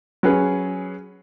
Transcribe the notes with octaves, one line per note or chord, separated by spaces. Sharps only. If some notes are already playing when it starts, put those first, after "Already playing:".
F#3 C#4 G#4 B4